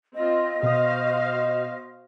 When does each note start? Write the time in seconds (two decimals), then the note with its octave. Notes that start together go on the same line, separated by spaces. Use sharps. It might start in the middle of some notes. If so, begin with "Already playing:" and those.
0.15 C4 F4 D#5
0.63 B2 F#4 C5 F5 D#6